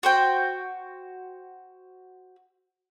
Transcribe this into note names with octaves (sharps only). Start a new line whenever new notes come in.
F#4 C5 G5